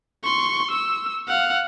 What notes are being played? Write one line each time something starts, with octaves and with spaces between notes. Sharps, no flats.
C6 C#6
E6
F5 F#5